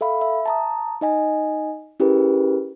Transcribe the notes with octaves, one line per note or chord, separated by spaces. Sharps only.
A4 E5 F5 B5
E5
A5 A#5 D#6
D#4 D#5 G#5
C#4 E4 G4 G#4 A#4 B4